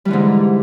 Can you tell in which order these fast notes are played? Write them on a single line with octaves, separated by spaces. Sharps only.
G3 E3 D3 G#2